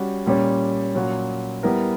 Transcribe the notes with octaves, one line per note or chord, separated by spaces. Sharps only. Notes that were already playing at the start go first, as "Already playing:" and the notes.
Already playing: G3 C#4 F#4
A#2 G3 C#4
A#2 F#3 C#4 F#4
G3 B3 E4 A#4